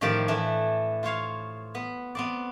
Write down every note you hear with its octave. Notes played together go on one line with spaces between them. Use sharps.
A2 D#3 F3 G4 D5 F5
E3 A3 D4 E4
F4 C5 C#5 F5
B3
B3 C4 D5